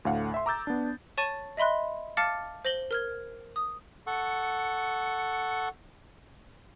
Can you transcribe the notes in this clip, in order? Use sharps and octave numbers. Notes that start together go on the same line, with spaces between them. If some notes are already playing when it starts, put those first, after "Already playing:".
D2 A2 F5 F#5
E5 C6
A#5 D6 E6 G6 A6
B3 D4
C#5 A5 C#6 A6 D#7
D#5 E5 B5 C6 F#6
F5 A5 D6 F6 A6 C#7
C5 A#6 F#7 G7
A#4 F6 G#6
D#6
A4 F#5 C#6